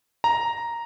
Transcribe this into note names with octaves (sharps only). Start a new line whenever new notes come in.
A#5